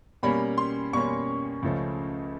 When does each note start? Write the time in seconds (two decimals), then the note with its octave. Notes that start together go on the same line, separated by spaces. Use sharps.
0.23 B2 G3 A#3 C#4 B5
0.58 C6
0.93 B2 G3 A#3 C#4 C#6
1.63 C#2 C#3 F3 A3 C#4